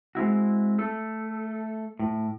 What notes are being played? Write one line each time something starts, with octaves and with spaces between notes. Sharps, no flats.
G#3 C4 E4 F#4
A3 A4
A2